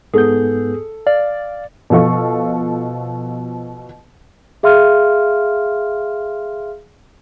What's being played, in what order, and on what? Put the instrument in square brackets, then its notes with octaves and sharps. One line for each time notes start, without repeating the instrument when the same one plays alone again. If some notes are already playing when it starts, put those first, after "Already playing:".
[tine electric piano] G#2 B3 G6 [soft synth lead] G#4 [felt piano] A4
[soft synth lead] D5 [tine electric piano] F5
[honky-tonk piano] B2 F3 A4 D#5 F5 C#6
[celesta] G#4 E5 F5 C6 F6